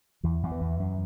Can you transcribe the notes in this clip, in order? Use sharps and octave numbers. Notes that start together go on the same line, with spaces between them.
E2 E3
E2
E3
E2
F#2